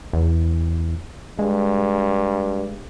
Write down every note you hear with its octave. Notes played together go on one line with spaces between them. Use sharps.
E2
G2 G#3